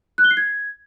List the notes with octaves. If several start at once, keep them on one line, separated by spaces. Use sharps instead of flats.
F#6
G7
C7
G#6